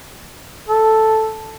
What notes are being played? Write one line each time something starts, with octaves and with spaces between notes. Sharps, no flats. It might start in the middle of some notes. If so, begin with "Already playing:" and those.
A4